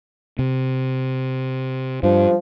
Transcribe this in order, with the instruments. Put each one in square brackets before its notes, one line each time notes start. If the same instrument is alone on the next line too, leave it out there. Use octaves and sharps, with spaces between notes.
[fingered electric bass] C3
[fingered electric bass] G2 [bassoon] F3